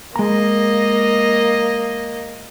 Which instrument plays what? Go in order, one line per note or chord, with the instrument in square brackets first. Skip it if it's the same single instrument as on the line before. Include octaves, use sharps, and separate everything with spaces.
[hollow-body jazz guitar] G#3 A#5 [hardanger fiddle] A#3 D#5